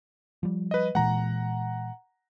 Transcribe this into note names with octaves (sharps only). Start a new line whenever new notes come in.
F3 G3
B4 D#5
A#2 E3 G#3 F#5 A#5